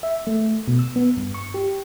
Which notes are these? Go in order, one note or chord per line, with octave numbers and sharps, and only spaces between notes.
E5
A3
B2
E6
B3
G2
C#6
G4